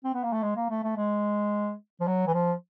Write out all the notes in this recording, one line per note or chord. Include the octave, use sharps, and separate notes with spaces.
C4
B3
A#3
A3
G#3
A#3
A3
A3
G#3
F3
F#3
E3
F3